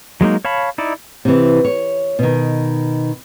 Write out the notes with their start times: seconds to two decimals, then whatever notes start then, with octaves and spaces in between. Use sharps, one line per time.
0.21 F#3 G#3 A#3 D#4
0.45 C#5 F5 A5 B5
0.78 D#4 E4 D5
1.25 C3 E3
1.65 C#5
2.19 B2 D#3